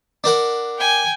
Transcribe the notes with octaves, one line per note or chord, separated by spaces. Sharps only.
D4 A#4 F#5
G5 G#5